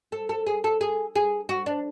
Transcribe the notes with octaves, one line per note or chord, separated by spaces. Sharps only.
A4
A4
G#4
A4
G#4
G#4
F#4
D4